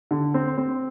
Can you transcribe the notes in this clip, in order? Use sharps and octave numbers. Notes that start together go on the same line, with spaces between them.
D3
C4
C4